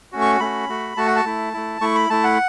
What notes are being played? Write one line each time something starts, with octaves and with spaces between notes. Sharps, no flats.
A3 C#4 F#4
C#6
A3 C#4 F#4 B5
A3 F#4
A3 F#4 A5
F#5
A5
A3 E4
A3 E4
A3 E4 C#6
B5
A3 E4 A5
F#5